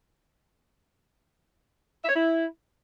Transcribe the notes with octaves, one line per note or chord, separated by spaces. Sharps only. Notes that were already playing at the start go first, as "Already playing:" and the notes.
E5
C#5
E4